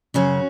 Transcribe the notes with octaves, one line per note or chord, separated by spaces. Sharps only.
F#2 C#3 C#4 F#4